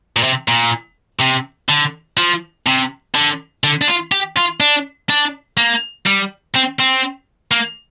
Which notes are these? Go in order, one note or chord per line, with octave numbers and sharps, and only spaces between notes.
A#2
C3
A#2
C3
D3
F3
C3
D3
D3
D4
F4
G4
F4
D4
D4
A#3
G3
C4
C4
A#3